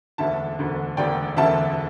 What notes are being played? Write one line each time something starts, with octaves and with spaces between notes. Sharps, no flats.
E1 D2 D3 E5 A5
E1 D2 D3
E1 D2 D3 D5 G5
E1 D2 D3 E5 A5